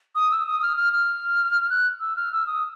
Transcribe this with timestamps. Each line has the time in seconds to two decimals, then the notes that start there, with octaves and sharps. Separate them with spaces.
0.15 D#6
0.31 E6
0.47 D#6
0.62 F6
0.77 F6
0.93 F6
1.70 F#6
2.00 E6
2.16 F6
2.32 E6
2.47 D#6